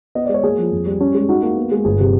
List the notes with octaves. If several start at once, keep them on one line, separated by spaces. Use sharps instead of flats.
B3 D#5
D5
G#3 C#5
A#3 G#4
F3
F2
G3
C#4
G#3
D#4 F#4
A#3 F#4
B3
G#3
G1 G#4
C3